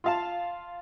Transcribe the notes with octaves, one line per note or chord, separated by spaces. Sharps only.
F4 F5 A5